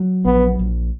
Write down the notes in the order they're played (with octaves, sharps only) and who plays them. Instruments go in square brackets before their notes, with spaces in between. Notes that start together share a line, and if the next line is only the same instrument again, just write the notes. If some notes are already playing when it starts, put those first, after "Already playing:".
Already playing: [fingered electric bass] F#3
[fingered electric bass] A#1 [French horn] B3
[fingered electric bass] A#1